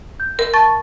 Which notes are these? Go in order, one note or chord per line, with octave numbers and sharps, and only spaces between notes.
G6
A#4
A5 C#6 A6